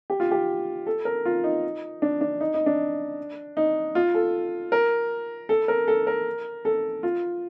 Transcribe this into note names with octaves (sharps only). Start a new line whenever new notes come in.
G4
F4
G4
A4
A#4
F4
D#4
D4
D4
D#4
D#4
D4
D#4
F4
A4
A#4
A4
A#4
A4
A#4
A4
F4